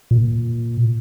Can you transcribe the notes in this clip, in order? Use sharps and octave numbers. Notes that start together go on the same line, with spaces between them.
A#2